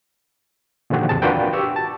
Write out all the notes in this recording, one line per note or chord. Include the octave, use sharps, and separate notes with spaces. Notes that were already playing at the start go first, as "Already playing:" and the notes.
A#2 D3 D#3 F3 F#4 G4
E2 C3 C4 G#4 A5
D4 F4 F#4 A#4 B4 G5
G4 C#6 E6
A5